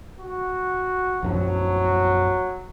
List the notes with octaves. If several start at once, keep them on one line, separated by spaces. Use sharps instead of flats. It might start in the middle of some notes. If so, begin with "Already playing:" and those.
F#4
A#1 F#2 F3 F#3